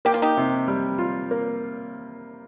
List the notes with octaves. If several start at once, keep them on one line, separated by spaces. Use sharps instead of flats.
A#3 G4
F4
D#4 G4
C3
G3
F4
A#3